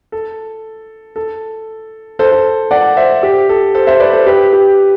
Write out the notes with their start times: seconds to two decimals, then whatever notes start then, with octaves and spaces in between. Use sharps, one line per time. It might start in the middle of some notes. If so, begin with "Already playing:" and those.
0.12 A4
1.16 A4
2.19 A4 C5
2.32 A4 C5
2.71 D5 F#5
2.97 C5 E5
3.23 G4
3.49 A4
3.75 A4 C5
3.87 C5 E5
4.00 B4 D5
4.13 A4 C5
4.26 G4 B4
4.53 G4